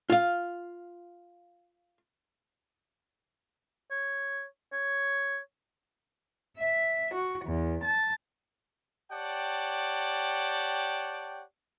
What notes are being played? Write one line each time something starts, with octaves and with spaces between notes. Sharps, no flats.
F4 F5
C#5
C#5
E5
F#4
E2
A5
G4 C#5 D5 F#5 G5 A5